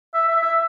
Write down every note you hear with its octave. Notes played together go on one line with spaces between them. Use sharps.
E5
E5
E5